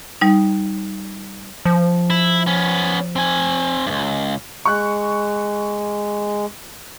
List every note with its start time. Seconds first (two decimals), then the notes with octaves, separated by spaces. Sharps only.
0.21 G3 D#4
1.65 F3
2.10 E4
2.47 B3 C#4
3.16 C4 G#5
3.86 C#2 G2
4.65 G#3 C#6 F#6